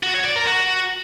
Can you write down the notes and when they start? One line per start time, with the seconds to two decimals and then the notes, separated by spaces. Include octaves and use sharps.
0.03 F#4
0.14 C#5
0.25 D5
0.36 A#4
0.47 F#4